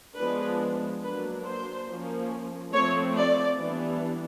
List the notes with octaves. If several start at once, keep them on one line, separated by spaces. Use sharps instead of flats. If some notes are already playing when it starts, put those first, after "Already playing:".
F3 G#3 B3 D4 B4
F#3 A#3 D4 B4
C5
F3 A#3 C#4
F3 A3 C4 C#5
D5
E3 G3 B3 D4